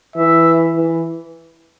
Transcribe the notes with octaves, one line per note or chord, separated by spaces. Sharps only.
E3 E5
E3